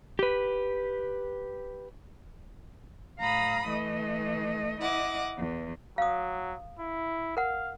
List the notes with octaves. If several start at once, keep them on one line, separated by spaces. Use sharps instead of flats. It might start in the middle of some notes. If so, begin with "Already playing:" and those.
G4 B4
A2 F5 A#5 B5 D#6
E3 A3 D#5
E4 D#5 F#5 D6
E2
F#3 F5 D#6
E4
A#4 F5 F#5